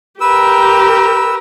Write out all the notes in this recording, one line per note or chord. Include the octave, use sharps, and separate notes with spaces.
G4 A#4 B4 E6